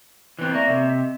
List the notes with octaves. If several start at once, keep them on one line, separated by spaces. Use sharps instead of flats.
E3 C4 F#6
A#3 D5 E5 C#6
C3 E5
D#5 B6